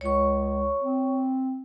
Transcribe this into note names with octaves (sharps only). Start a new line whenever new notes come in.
C#2 C#5 C#6
C4